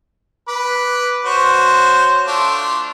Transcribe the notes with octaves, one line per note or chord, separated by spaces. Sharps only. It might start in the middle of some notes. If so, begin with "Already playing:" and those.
B4 B5 D6
F#4 C5 C#5
A3 D4 F4